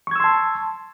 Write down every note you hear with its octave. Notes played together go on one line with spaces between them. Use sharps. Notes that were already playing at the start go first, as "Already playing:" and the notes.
A5 C6 C#6 E6 G#6